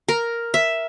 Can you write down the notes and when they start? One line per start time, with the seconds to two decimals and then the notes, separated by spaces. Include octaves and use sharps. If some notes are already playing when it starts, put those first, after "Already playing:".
0.09 A#4
0.54 E5